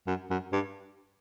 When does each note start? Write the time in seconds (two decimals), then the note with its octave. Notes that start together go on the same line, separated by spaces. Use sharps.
0.07 F#2
0.30 F#2
0.52 G2